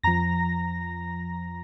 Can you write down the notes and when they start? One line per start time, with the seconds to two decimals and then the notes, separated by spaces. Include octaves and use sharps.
0.03 F2 F3 A#5 A#6